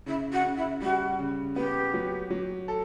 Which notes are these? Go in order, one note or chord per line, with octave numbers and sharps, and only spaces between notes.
C#3 E4
F#4
C#3
E4
G3 F#4
C#3
B3 G4
F#3
F#3
A4